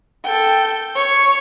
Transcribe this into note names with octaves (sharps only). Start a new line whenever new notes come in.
A4 G5
C#5